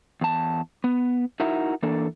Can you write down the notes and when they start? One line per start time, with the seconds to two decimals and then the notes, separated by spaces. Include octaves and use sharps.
0.21 E2 A5
0.84 B3
1.40 D#4 E4 F#4 A#4 E5
1.83 E3 A#3 D4 A4